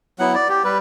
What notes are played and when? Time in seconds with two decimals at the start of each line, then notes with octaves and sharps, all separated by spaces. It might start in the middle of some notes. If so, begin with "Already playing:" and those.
0.19 F#3 B3 E4 F#5
0.34 D5
0.49 G4
0.64 G3 B4